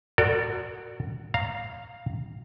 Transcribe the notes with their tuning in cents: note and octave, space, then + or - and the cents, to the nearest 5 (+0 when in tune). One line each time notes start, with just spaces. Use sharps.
F#4 +0 A#4 -45 D5 +0
F5 +5 A#5 -10